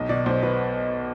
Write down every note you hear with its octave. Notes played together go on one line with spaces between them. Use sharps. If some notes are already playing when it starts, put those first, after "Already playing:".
Already playing: B1 D#5
B2 D5
B1 C5
B2 B4